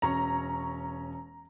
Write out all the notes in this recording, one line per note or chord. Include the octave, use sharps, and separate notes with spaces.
E1 C#4 A#5 C#6